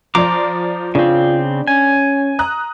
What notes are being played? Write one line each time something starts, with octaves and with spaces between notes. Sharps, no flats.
F3 C5 D5 A#5 D6
C#3 C4 D4 F4
C#4 G#5
A#5 D#6 F#6